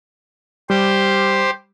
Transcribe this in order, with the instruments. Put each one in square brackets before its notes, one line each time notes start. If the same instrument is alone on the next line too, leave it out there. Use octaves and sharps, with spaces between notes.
[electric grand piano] G3 [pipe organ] G4 C5